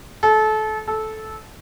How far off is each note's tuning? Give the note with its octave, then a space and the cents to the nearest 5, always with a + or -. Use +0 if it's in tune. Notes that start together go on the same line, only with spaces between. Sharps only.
A4 -30
A4 -15